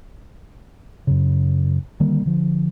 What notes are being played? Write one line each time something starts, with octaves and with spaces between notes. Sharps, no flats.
F#2 C#3
D3 D#3 G3 A#3
D3 F3